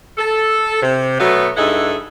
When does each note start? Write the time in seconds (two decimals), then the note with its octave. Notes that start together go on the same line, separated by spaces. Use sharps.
0.18 A4
0.82 C3
1.20 B2 F#3 A3 B3
1.57 G2 D#4 E4 G#4 A4 F#5